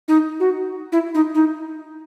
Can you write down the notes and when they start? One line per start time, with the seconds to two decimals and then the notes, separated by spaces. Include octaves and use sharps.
0.08 D#4
0.40 F#4
0.92 E4
1.15 D#4
1.35 D#4